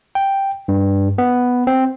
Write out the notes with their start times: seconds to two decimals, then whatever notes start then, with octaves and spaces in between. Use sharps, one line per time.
0.15 G5
0.68 G2
1.18 B3
1.67 C4